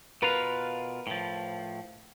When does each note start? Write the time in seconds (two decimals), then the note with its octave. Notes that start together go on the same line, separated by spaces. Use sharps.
0.22 B2 F4 A#4 B4 F5
1.07 A2 F3